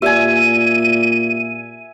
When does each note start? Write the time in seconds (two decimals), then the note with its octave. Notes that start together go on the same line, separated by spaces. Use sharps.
0.02 A#2 G4 D5 E5 G#5 D#7